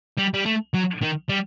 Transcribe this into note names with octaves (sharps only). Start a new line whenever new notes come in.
G3
G3
A3
F#3
D#3
G3